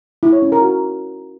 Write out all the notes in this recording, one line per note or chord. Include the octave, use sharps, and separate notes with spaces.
E4
C#5
C#4
A#4
F#4